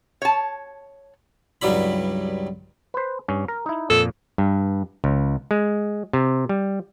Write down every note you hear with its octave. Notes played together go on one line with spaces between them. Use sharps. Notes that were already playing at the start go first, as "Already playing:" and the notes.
C#5 A5
C#2 G2 F#3 G3 E4 B5
B4 C5
G2 C#4
A#4
D#4 E4
F2 A#2 A4
G2
C#2
G#3
C3
G3